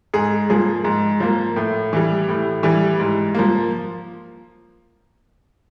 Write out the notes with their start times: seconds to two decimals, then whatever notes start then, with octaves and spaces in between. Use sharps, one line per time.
0.14 G#2 G#4
0.50 F3 A#3 G#4
0.85 G#2
1.20 F3 A#3
1.56 A2
1.93 E3 G3
2.29 A2
2.63 E3 G3
2.99 G#2
3.34 F3 A#3